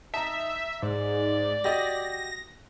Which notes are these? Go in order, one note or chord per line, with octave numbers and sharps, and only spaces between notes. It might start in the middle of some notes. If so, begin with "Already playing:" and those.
D#4 E5 A5 A#5
G#2 D5
F#4 G4 D#5 A#6